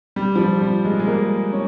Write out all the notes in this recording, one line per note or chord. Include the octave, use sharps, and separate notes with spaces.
G3
F3
G3
G3
G#3
G#3
A#3
C#4